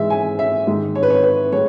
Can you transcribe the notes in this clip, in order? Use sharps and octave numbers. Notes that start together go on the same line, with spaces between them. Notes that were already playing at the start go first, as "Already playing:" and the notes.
Already playing: G#2 E3 G#3 E5
G#5
E5
G#2 D#3 G#3
C#5
B4
C#5
B4
A2 G#3 C#5